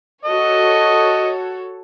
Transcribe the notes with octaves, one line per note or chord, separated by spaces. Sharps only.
F#4 A4 C#5 D#5